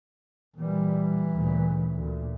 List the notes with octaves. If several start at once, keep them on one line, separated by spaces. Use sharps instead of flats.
A#2 E3 G3
D2 A#2 C#3
D2 A#2